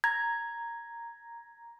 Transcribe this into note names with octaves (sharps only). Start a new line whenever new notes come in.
A#5 G#6